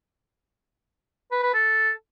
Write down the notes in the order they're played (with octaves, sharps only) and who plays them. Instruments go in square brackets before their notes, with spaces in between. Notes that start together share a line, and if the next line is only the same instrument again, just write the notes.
[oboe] B4
B4
A4